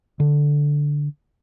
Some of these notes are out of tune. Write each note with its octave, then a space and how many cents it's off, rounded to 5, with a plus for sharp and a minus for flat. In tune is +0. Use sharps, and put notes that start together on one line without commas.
D3 -5